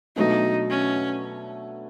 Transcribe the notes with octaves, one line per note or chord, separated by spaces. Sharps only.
B2 F#3 A3 D4 D#4
C#4